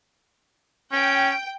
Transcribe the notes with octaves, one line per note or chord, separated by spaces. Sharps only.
C#4 G5